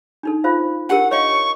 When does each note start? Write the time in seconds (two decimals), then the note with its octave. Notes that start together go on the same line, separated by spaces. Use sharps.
0.23 D4 D#4 A4
0.44 F4 C5 F5
0.89 D4 G4 A#4 F#5
1.11 C#5 D#5 F5 C#6